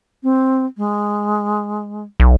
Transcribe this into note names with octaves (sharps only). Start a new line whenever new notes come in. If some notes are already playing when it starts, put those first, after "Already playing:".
C4
G#3
B1